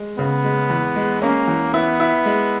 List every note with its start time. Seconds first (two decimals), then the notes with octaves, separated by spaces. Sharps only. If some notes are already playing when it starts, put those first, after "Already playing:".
Already playing: G#3
0.18 C#3 B3
0.44 G#3
0.70 E2
0.96 G#3
1.22 A#3 C#4
1.48 E2
1.74 B3 E4
2.00 E4
2.26 G#3